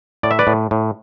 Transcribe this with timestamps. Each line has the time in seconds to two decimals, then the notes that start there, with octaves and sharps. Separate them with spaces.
0.23 A2 D5
0.31 E5
0.39 B4 D5
0.47 A2
0.71 A2